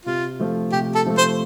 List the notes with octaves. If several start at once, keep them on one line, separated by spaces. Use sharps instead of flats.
C3 F4
F3 A3
C3 G4
A4
F3 A3
C5